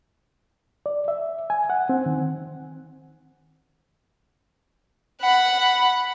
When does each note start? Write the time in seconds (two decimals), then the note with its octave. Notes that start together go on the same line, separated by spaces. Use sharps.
0.86 D5
1.08 E5
1.50 G#5
1.70 F#5
1.89 C4
2.06 D#3
5.21 F#5 B5